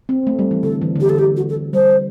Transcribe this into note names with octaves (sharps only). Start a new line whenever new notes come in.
C4
A3
G3
E3
D3 A4
E3
D3
E3 G4
A4
G4
F#4
A4
G3 C5